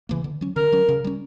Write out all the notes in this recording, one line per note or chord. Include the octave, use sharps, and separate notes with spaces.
C#3 E3 A#3
D3
F#3 C#4
D3 A#4
F#3 C#4
C#3
G3 C#4